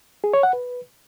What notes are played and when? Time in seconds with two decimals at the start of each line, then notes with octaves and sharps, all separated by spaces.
0.24 G#4
0.34 C#5
0.43 F#5
0.53 B4